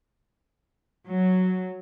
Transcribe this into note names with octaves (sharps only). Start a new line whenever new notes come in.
F#3